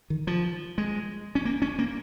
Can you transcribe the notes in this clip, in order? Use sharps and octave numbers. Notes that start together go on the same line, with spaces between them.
D#3
F3
G#3
C#4
A#3
C#4
A#3